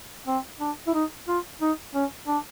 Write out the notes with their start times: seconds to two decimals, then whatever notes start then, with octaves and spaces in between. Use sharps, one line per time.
0.27 C4
0.60 D4
0.87 E4
0.94 D#4
1.28 F4
1.61 D#4
1.94 C#4
2.27 D4